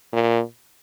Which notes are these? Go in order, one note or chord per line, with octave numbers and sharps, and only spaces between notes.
A#2